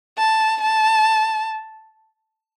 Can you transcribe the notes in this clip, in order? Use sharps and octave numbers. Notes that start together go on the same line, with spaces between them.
A5
A5